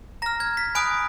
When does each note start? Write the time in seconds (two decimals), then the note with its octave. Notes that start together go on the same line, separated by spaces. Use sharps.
0.22 A#5 F6 A#6
0.40 G#6
0.57 B6
0.75 G#5 B5 D#6 F#6 D7